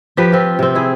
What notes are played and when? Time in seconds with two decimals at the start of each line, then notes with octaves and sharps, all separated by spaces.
0.17 F3 G4 B4
0.32 C4 F4
0.59 C3 C4
0.75 E4 G#4